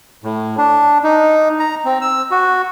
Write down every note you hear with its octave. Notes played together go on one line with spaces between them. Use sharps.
A2
D4
D#4
A#5
C4
E6
F#4